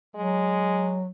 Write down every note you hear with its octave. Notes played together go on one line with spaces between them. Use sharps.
F#3 G#3